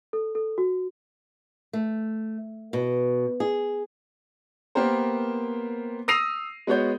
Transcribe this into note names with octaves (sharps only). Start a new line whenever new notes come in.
A4
A4
F#4
A3
B2
G#4
A#3 B3 G4 A#4 C5
D#6 E6 A#6 C7 D#7 F7
G#3 B3 F#4 C#5 G6